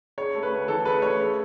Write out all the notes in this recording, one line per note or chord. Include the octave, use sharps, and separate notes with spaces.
C#3 C#5
A3
B4
D2
E3 A4
C#3 B4
A3 C#5
C#3